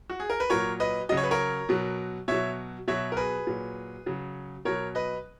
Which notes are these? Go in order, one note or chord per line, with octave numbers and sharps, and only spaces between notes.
F#4
G#4
A#4
B4
A#2 F#3 A#4 C#5
B4 D#5
C#3 F#3 D#5
C#5
B4
A#4 C#5
B2 F#3
B2 F#3 C#5 E5
B2 F#3 C#5 E5
A#4
G#4 B4
A#2 F#3
C#3 F#3
B2 F#3 A#4 C#5
B4 D#5